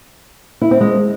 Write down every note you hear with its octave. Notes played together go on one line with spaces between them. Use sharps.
E4
C4
G#3